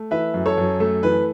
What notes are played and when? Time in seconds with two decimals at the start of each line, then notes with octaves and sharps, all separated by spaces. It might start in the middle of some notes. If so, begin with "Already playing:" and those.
Already playing: A3
0.11 E3 B4 E5
0.34 F#2
0.46 A4 C#5
0.58 F#2
0.80 A3 A4
1.03 E3 B4